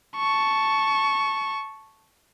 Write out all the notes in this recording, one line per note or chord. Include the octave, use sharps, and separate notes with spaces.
A5 C#6